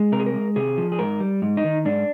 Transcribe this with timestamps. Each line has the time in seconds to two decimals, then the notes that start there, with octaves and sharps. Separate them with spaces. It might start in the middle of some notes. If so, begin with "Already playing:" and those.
Already playing: G#3
0.12 C3 A#4
0.20 G#4
0.26 A#4
0.34 G#3
0.56 C3 G#4
0.78 F3
0.92 G#4
0.99 G#2 A#4
1.20 G3
1.42 G#2
1.57 D#4
1.64 D#3
1.85 G#2 D4